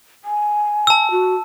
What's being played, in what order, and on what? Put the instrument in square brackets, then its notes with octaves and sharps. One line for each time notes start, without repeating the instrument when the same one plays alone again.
[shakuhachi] G#5
[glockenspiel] A5 E6
[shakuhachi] F#4